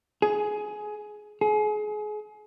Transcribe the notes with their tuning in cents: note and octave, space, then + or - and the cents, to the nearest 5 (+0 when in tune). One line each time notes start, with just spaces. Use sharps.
G#4 +15
G#4 +30